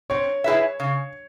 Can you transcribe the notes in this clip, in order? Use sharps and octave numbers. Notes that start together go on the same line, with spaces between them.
C4 C#5
E4 G#4 B4 E5
C#3